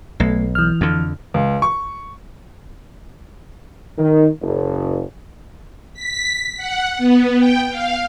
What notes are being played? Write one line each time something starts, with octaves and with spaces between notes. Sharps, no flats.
B1 A3
E3 F6
F2 D3
C#2
C#6
D#3
F#1
B6
F#5
B3
G5
F5